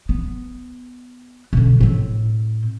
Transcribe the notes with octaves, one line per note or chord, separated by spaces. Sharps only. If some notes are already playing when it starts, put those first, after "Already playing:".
B3
B2 D3
A2 C4